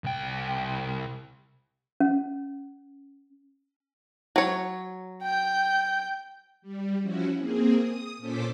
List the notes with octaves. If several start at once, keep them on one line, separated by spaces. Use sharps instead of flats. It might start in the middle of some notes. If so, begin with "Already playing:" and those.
C2 G5
C#4
F#3 C#5
G5 G6
G3
F3 C#4 E4 F#4
A#3 C4 G#4
D#6
A#2 C#4 A4 C5 D6 B6